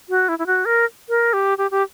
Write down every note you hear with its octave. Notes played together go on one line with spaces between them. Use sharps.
F#4
E4
E4
F#4
A#4
A#4
G4
G4
G4